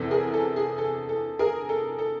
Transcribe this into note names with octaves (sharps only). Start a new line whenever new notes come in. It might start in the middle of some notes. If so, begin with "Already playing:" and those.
Already playing: E2 C3 E3 A4
G#4 A#4
A4
G#4
A4
A4
G#4 A#4
A4
A4